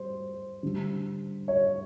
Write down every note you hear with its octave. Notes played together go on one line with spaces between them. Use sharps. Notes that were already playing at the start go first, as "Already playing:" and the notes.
Already playing: G3 C5
D3 G3
C#5